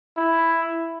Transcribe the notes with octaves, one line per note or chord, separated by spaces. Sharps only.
E4